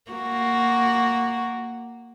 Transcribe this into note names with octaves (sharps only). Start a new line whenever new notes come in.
A#3 F#4